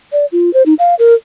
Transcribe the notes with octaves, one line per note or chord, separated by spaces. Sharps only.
D5
F4
C5
D#4
F5
A#4